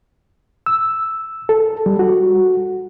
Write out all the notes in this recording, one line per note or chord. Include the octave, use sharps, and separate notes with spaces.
E6
A4
G3
F#4